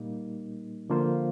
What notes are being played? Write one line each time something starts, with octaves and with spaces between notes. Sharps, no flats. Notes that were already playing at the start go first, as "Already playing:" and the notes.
Already playing: A#2 G3 A#3 D#4
D3 F3 A#3 F4 C5